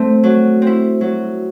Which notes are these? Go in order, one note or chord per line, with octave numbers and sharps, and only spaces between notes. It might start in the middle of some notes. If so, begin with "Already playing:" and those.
Already playing: A3 C4
F#3
C4 E4
F#3